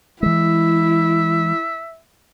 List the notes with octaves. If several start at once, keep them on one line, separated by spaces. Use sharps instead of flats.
E3 G#3 E4 E5